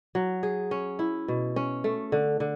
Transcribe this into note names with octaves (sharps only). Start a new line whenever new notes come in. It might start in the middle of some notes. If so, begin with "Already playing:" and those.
F#3
G#4
C#4
E4
B2
C#4
A3
D3
D3